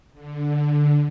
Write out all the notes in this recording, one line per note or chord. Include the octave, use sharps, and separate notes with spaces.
D3